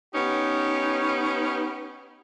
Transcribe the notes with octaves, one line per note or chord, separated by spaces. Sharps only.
B3 C#4 D#4 G4